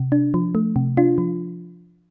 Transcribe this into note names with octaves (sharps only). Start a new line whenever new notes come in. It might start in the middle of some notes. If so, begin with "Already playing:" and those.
Already playing: C3
D4
F3
A3
C3
D4 F4
F3